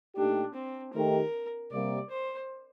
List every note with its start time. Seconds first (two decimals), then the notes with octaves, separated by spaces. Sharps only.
0.16 A#2 A3 D4 D#4 G4
0.54 C4
0.94 D#3 A3 D#4 G4 A#4
1.71 C3 G3 A#3 D5
2.10 C5